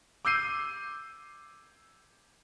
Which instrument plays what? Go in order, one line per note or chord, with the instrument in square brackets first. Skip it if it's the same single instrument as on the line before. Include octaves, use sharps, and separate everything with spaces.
[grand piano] D6 E6 G6 C7 D#7